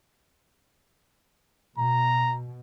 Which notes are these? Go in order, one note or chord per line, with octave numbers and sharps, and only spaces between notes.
B2 A#5